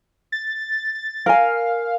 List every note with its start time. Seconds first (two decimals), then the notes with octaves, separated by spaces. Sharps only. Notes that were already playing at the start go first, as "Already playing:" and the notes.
0.32 A6
1.26 A#4 F5 G#5